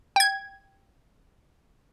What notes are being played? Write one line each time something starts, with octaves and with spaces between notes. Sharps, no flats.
G5 G#6